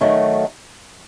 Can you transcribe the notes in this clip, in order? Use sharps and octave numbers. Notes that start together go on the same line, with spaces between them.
D#3 F#3 A3